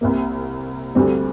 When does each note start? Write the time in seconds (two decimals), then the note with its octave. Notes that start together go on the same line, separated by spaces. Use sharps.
0.01 C2 C3 A#3
0.95 D2 D3 G3 C4